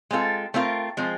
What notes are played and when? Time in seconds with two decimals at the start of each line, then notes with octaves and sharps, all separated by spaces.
0.11 G#3 C4 F4 A4
0.54 A3 C4 F4 A#4
0.97 F3 G#3 C4